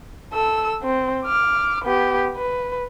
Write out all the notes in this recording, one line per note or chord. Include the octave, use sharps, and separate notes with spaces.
A4 E6
C4
D6 F6
B3 G4
B4